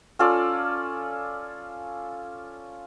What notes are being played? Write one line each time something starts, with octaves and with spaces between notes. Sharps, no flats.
C#4 F4 A4 D5